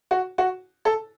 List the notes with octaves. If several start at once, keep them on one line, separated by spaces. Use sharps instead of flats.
F#4
F#4
A4